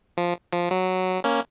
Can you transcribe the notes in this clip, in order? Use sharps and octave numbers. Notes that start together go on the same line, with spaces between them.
F3
F3
F#3
A#3 C#4